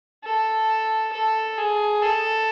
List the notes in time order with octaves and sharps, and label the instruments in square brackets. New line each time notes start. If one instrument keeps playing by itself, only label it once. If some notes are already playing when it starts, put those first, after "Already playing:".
[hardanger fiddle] A4
A4
G#4
A4